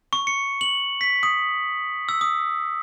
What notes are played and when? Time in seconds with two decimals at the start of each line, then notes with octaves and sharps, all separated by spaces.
0.13 C#6
0.27 C#7
0.61 F#7
1.01 B6
1.23 D#6
2.09 E6
2.21 D#6